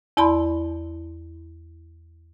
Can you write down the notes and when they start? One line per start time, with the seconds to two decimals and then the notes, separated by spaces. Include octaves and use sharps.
0.17 E2 E4 D5 A5 B5 C6